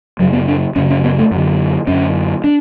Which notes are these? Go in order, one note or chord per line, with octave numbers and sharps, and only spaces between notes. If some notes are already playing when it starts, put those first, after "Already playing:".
F#2 C#3 F#3
B3
D4
F#2 C#3 C#4
C#4
B3
A3
F#2 D3
F#2 D3 C#4
D4